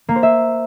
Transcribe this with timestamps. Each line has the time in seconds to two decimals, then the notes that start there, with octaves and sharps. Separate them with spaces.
0.09 A#3
0.16 C5
0.23 E5